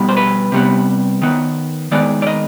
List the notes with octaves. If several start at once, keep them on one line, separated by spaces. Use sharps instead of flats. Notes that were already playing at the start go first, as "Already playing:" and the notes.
Already playing: B2 G3 B3
C5
B4
C3 G3 B3
D#3 B3
D#3 G#3 B3 D5
D5
D#5